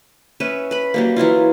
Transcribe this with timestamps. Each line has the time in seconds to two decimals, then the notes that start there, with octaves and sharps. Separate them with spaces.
0.40 C#4 B4 E5
0.71 B4 B5
0.94 F#3 G3 A#3
1.16 E3 F#3 E4 F4